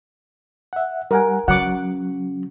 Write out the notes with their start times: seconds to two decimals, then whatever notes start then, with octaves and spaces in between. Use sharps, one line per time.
0.73 E5 F#5
1.11 G3 A#4 F#5 G#5
1.48 C#3 F#3 F#5 D6